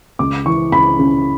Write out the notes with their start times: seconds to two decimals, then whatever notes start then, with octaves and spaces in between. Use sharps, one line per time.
0.19 C#2 D6
0.46 E3 C#6
0.72 C#2 B5
0.99 C#3